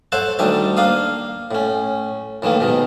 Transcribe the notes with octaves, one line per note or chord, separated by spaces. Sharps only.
A4 C5 C#5 E5 F#5 A5
D2 D#3 G3 E5 A5
A#3 D4 F5 D#6
A2 C#4
A2 D#3 E3 A#3
G#2 B2 D#3